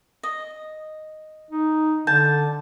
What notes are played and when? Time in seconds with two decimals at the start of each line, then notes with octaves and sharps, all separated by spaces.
0.23 D#5
1.51 D#4
2.07 D3 A5 G6